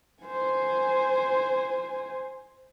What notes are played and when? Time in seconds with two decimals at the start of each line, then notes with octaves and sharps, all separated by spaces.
0.23 C5 G#5